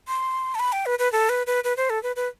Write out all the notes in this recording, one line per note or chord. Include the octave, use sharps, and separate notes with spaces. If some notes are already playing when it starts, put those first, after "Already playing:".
C6
A5
B5
G5
B4
B4
A4
B4
B4
B4
C5
A4
B4
B4